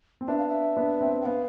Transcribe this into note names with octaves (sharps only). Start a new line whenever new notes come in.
C4
B3 D4 E5
F5
E5
B3 D4
C4
G5
B3 F5